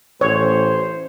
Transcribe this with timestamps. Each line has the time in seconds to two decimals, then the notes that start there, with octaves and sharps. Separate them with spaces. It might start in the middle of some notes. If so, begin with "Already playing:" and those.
0.21 A1 C5 C#5